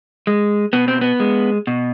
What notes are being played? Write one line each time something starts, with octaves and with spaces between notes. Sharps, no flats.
G#3
B2 B3
C4
B3
G#3
B2